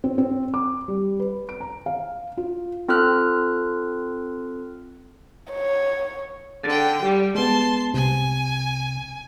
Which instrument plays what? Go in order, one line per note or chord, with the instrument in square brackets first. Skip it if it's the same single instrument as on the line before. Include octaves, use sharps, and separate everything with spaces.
[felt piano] C4
C4
D6
G3
B4
D7
A#5
F5
F4
[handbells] C4 F4 A4 F6 F#6
[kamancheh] C#5
[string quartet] D3 G5 [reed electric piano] A6
[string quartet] G3 [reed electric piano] G4
[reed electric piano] G#3 B3 [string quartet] A5 C6
[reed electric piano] C2 C3 [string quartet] G#5